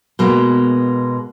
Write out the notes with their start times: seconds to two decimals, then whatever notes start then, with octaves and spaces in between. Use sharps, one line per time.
0.19 B2 G#3 A#3